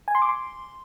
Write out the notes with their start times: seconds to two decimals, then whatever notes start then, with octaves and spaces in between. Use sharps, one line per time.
0.08 G#5
0.15 C6
0.22 D6
0.29 C6